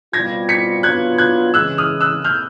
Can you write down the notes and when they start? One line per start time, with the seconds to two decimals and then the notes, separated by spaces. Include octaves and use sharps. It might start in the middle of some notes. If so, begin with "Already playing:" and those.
0.13 B2 G3 C4 F4 G#6 A#6
0.49 B6 C#7
0.83 F#3 B3 D4 F4 F#6 G#6
1.18 F#6 G#6
1.54 C#3 E3 G#3 E6 F#6
1.78 D#6 F6
2.01 E6 F#6
2.24 F6 G6